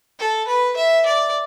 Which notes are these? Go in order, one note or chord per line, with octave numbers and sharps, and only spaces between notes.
A4
B4
E5
D5